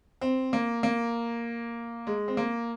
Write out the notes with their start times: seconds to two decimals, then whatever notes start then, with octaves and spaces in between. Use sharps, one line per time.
0.21 C4
0.53 A#3
0.83 A#3
2.07 G#3
2.28 C4
2.37 A#3